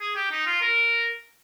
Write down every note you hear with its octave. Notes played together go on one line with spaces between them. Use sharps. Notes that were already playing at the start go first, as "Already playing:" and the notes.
G#4
G4
D#4
F4
A#4